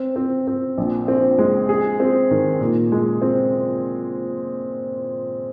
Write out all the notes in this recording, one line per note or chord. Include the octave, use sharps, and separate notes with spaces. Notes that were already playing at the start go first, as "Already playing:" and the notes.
Already playing: C4
C4
C4
A#1
C4
G#3
G#4
C4
D#3
A#2
G#3
C4